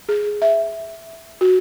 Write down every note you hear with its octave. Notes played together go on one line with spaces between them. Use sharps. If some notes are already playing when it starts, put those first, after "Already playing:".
G#4
E5
F#4